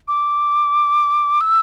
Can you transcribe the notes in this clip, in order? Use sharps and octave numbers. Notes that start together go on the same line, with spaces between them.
D6
E6